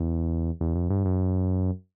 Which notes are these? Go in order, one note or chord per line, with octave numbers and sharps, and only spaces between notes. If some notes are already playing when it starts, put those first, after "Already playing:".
Already playing: E2
E2
F2
G2
F#2